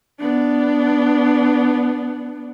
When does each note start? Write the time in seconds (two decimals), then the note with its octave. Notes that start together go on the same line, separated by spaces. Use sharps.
0.20 B3 D4